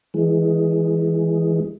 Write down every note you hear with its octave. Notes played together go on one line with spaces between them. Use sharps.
E3 G#3